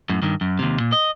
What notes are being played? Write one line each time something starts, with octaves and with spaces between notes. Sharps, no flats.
F#2 A2
G2 D#3
F#2
D#2 C3
A#2
D#5